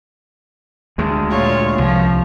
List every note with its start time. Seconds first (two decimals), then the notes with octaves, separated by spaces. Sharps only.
0.98 D2 G#3
1.30 A#2 F4 C#5
1.78 C2 F3